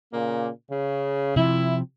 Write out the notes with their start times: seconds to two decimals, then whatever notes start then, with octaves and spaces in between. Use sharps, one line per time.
0.12 A#2 C#3 A#3
0.70 C#3
1.36 C3 F3 E4